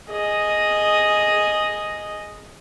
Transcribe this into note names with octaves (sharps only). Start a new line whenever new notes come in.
G#4 D#5